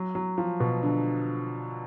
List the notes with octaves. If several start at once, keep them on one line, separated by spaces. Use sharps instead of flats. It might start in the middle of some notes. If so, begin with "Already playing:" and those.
Already playing: F#3
F#3
F3
B2
D3